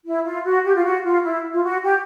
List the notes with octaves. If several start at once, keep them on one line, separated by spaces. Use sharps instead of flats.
E4
F4
F#4
G4
F4
F#4
F4
E4
F4
F#4
G4